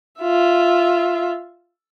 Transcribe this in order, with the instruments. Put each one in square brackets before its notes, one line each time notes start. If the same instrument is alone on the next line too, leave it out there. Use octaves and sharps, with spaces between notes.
[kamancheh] F4 E5